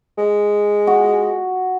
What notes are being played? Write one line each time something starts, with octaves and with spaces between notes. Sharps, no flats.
G#3
F#4